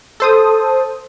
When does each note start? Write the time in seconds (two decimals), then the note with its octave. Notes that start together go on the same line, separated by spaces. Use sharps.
0.20 A4 C5 D#6